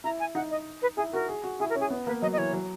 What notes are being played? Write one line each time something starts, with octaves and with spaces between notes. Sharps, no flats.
E4 A#5
G#5
D#4 F#5
D#5
B4
E4 G#4
F#4 A#4
G#4
F#4
E4 G#4
A#4
C#4
G#4
B3
A#3 B4
F#3 D#5
D#5
E3 C#5
F#3